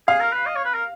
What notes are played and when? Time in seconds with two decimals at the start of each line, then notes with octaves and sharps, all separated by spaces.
0.08 G#4 F5
0.20 A#4
0.33 B4
0.46 D#5
0.56 C#5
0.65 B4
0.74 A#4